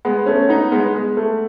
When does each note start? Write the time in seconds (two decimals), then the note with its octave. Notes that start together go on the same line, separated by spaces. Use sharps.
0.05 G#3 B3
0.26 A3 C#4
0.49 B3 D#4
0.71 G#3 B3
0.94 G#3
1.17 A3